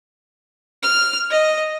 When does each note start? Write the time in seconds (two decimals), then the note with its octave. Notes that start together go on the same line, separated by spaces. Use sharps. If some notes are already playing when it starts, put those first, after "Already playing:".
0.83 F6
1.31 D#5